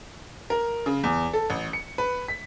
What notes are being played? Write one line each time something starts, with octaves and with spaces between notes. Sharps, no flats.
A#4
C#3
E2
A4
A1
C#7
B4
B6